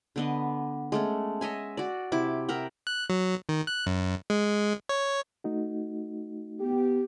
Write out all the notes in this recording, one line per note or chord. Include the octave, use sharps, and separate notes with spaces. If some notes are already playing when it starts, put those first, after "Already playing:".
D3 B3 D#5
G#3 A3 C#4
C#5 D#5 E5 G#5
F#4 D5
C3 E4 D6
A#4 E5 F#5 G5
F#6
F#3
D#3
F#6
F#2
G#3
C#5
A3 D#4 F#4
B3 G4